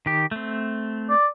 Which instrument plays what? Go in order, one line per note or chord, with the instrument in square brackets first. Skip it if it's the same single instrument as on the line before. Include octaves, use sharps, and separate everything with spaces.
[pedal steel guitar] D#3 G4
A3 C4
[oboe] D5